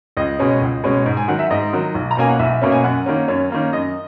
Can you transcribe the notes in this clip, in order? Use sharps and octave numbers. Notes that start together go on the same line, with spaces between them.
C#2 D#5
B2 G#3 C#4
C#2
B2 G#3 C#4
G#2
G#5
D#3 F#3 F#5
E5
G#2 D#5
D#3 F#3
B1
A#5
B2 A#3 C#4 G#5
F#5
B1 E5
B2 A#3 C#4
G#5
F#2 F#5
D#3 A#3 C#4
F#2 C#5
D#3 A#3 C#4
F#2 D#5